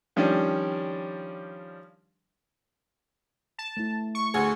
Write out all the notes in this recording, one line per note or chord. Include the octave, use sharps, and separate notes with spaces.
D#3 F3 G3 C#4 D4
A5
A3 E4
C#6
D2 G#4